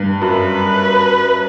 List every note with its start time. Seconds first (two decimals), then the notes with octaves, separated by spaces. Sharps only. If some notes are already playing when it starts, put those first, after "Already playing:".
Already playing: G2
0.22 F#2 B4